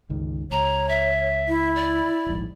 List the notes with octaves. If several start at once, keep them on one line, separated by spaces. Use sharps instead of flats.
G1 C#2 D#3
C#2 C#5 A#5
E5
E4
D5
D#1 A#1 G#2